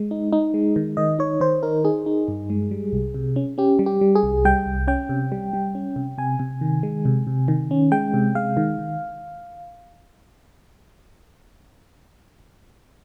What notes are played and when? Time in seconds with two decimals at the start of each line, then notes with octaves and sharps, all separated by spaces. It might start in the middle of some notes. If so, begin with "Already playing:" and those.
Already playing: G#3
0.11 D#4
0.33 D#4
0.54 G#3
0.76 D#3
0.97 D#3 D#5
1.19 D#4 C#5
1.41 D#3 C5
1.63 D#4 A#4
1.84 D#4 G#4
2.06 D#4
2.28 G2
2.50 G#3
2.71 G3
2.93 C2
3.14 C3
3.36 C#4
3.58 C#4 G4
3.79 G3
3.86 G4
4.01 G3
4.16 G#4
4.23 C2
4.45 G3 G5
4.66 C2
4.88 C#4 G5
5.09 C3
5.32 G3
5.53 G3
5.75 C#4
5.96 C3
6.18 C3 G#5
6.39 C3
6.61 D#3
6.83 G#3
7.05 C3
7.27 C3
7.48 D#3
7.71 C#4
7.92 G#3 G5
8.14 C3
8.35 G#3 F5
8.57 D#3
8.78 D#3